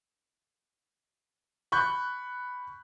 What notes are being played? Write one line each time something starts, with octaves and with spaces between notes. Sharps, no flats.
B5 C#6 F#6 G6